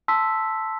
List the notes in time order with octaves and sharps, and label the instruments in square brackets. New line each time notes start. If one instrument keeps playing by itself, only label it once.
[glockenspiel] A5 C6 E6 B6